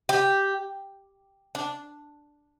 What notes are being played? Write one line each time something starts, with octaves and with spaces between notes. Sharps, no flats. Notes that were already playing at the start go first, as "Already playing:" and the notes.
G4
D4